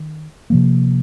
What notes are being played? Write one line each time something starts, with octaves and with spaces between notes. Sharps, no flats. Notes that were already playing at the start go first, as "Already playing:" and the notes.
Already playing: D#3
C3 F3 A#3